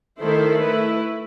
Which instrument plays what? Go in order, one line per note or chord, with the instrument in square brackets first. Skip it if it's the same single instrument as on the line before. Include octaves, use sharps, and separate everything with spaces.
[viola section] D#3 A3 E4 A4 C5
A3 E4 B4